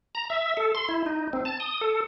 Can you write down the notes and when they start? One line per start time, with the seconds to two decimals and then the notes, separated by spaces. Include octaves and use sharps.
0.15 A#5
0.30 E5
0.57 A4
0.75 C6
0.89 E4
1.06 D#4
1.33 C4
1.45 A5
1.60 D#6
1.81 A4